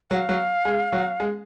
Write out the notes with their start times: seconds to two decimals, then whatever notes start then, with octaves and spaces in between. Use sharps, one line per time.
0.10 F#3 F#4 F#5
0.15 F5
0.29 F#3 F#4
0.65 G#3 G#4
0.92 F#3 F#4
1.20 G#3 G#4